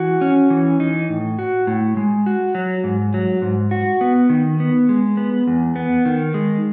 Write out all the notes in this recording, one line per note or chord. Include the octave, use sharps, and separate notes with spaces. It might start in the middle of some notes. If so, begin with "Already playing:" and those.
Already playing: E3 F#4
C#4
E3
D#4
A2
F#4
A2
G#3
F#4
F#3
G#2
F#3
G#2
F#4
B3
D#3
B3
G#3
B3
E2
B3
D#3
G#3